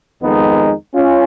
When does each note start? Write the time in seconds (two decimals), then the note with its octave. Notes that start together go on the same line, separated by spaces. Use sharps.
0.22 F2 D#3 G#3 B3 D#4
0.94 C#4 F4